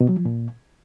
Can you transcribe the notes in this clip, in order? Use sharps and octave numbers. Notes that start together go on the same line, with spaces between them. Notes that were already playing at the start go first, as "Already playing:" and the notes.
B2
F#3
F3
A#2